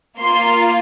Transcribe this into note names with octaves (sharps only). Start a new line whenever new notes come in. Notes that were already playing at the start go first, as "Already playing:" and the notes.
A#3 F4 C6